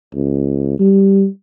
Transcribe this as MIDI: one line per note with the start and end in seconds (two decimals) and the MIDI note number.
0.14 0.75 37
0.80 1.26 55